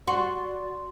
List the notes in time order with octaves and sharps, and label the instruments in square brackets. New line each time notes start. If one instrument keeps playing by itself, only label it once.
[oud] F#4 [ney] D5 [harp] C6